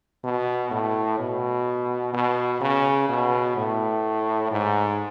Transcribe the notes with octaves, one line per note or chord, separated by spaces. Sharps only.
B2
A2
B2
B2
C#3
B2
A2
G#2